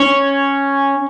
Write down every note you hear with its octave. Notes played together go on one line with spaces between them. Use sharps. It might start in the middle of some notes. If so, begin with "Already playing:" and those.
Already playing: C#4 C#5